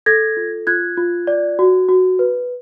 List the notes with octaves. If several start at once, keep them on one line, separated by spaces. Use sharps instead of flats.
A4 G#6 A#6
F4
F4 F#6 G#6
F4
D5
F#4
F#4
B4